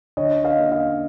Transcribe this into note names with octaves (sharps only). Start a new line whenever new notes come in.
D3 C#5 D#5
D#5 F5
A#3
D#5 F5